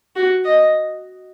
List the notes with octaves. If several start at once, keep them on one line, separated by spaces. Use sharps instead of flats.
F#4
D#5